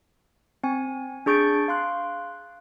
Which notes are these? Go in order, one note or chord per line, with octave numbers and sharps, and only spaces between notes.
C4 G#5
D4 G#4 C#6 G6 A6 D7
F5 C6 F#6